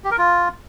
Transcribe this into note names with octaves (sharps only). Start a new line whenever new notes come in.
G4
A#4
F4